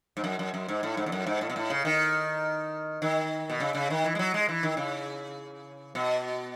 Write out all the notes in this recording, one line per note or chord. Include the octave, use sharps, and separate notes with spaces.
G#2
F#2
F#2
F#2
G#2
A2
G#2
E2
F#2
G#2
A2
B2
A2
C#3
D#3
D#3
B2
C#3
C#3
D#3
E3
G#3
F#3
G#3
E3
D#3
C#3
B2